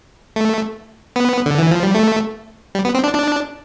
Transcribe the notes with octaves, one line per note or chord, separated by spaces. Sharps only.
A3
B3
D3
E3
F3
G3
A3
G3
B3
C4
D4
D4